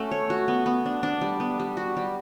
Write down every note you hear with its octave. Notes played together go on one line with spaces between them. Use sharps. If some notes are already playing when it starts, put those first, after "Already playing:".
Already playing: A3 C#4 F#4
C#5
F#4
B3
B3
D4
D4
G3
B3
G3
F#4
G3